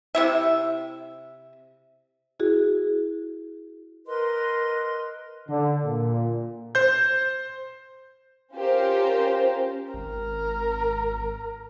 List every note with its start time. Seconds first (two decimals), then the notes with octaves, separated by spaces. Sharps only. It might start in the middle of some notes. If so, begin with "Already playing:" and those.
0.15 C3 E4 E5
2.40 E4 F#4 G#4
4.05 A#4 B4 D#5 C6
5.49 D3
5.84 A#2
6.75 C5 G6
8.53 C#4 F4 G4 A#4 C5
9.94 G#1 A#4